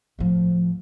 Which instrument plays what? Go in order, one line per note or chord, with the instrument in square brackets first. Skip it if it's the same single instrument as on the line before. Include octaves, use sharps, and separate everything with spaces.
[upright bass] A2 F3